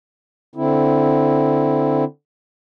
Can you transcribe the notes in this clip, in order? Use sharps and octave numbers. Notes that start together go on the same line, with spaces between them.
D3 C4 E4